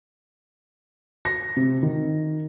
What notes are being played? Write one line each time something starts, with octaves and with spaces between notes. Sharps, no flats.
A#6
C3
D#3